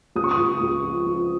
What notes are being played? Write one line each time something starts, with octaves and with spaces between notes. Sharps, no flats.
C#2 D#6
C#6
D#6
C#2
C#2
F3
F3